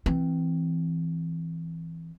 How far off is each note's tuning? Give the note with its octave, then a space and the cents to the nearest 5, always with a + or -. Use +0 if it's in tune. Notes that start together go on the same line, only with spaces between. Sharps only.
E3 +0 C4 +0